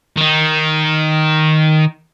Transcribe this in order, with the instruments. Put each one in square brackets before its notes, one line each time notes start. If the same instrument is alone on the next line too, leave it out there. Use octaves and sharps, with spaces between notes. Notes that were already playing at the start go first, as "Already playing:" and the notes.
[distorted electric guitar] D#3 D#4